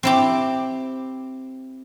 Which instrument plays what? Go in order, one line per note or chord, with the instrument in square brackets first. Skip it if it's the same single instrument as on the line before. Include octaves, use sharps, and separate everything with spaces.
[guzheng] C4 E4 G4